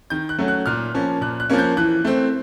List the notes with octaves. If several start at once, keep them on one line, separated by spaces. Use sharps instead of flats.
D#3 G6
F#6
F#3 A3 C#4
F#6
A#2 F6
F3 A#3 C#4
A#2 F#6
F#6
F3 A#3 C#4
G6
E3 F#6
A3 C4